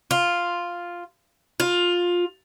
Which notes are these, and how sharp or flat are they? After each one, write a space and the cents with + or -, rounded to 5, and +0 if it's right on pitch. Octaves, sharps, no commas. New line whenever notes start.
F4 +0
F4 +15